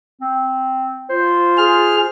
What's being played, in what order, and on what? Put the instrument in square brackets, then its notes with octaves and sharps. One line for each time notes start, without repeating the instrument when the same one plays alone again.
[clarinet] C4
[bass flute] F4 [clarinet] C5
[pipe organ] G#4 F6